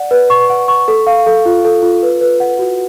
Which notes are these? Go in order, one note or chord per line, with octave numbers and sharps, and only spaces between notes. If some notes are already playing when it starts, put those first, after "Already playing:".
Already playing: D5 F#5
B4
C#6
F#5
C#6
A4
F5
A4
F4
A4
F4
B4
B4
F#5
F#4